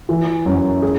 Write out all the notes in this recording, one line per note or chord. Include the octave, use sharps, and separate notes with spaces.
E3
F#2
G#4